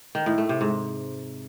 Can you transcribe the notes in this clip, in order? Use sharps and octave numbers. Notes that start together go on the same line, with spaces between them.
D#3
A2
A3
C3
G#2